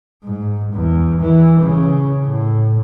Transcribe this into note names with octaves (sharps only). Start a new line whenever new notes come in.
G#2
E2
E3
C#3
A2